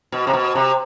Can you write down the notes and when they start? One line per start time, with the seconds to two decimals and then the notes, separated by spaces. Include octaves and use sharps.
0.12 B2
0.27 C3
0.33 B2
0.55 C3